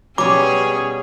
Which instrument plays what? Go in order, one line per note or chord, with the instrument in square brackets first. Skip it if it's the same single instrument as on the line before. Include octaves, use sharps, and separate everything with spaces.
[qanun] B2 G3 [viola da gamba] C#4 G#4 [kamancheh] C#5 [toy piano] D6